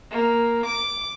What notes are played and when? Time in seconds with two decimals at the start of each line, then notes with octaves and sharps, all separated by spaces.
0.12 A#3
0.66 D6